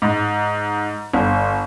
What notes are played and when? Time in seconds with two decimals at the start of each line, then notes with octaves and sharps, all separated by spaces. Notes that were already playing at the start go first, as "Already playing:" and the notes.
0.02 G#2
1.14 G1